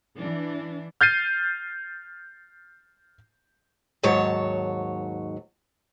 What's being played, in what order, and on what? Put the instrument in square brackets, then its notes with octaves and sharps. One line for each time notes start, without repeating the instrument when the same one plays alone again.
[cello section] E3 D4
[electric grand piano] F6 G6 A6 C7 D#7
[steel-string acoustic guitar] D#2 G#2 F#3 C#5 A5